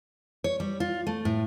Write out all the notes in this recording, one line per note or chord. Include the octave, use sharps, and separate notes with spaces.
C#5
G3
F4
A3
A2